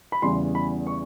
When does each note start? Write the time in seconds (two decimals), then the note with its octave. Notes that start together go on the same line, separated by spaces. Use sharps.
0.12 B5
0.22 E2 C#3 E3 G3 C6
0.55 B5
0.87 C#6